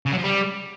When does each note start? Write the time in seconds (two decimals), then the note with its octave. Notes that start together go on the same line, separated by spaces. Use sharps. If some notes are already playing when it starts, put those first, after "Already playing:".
0.06 C#3
0.12 F#3
0.18 F3
0.24 G3